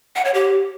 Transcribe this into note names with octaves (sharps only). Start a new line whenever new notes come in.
F#5
C#5
G4